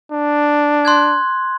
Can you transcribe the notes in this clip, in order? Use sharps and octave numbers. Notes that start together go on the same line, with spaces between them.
D4
C6 F#6 G#6